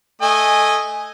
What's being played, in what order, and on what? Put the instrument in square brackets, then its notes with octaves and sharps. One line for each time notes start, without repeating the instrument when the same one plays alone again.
[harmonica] A3 D#5 G#5